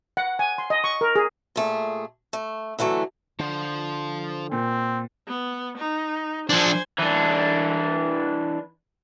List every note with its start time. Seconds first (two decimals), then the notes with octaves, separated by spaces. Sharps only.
0.17 F#5
0.39 G#5
0.58 C6
0.70 D#5
0.84 C#6
1.01 A#4
1.16 G#4
1.56 A#2 A3 G#4
2.33 A3
2.79 D3 E3 F#3 A3
3.39 D3 F3 C5
4.52 A#2 C4
5.27 B3
5.78 D#4
6.50 F3 D4 C5 G#5
6.99 E3 D4